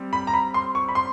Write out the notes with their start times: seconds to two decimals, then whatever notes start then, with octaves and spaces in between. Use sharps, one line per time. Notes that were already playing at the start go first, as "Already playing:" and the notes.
Already playing: G3 C4
0.13 B5
0.27 A#5
0.34 B5
0.54 C6
0.75 C#6
0.89 B5
0.95 C6